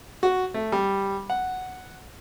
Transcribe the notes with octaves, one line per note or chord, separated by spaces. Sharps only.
F#4
A3
G3
F#5